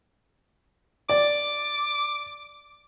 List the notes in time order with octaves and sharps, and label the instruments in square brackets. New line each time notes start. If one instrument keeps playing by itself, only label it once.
[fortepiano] D5 [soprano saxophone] D6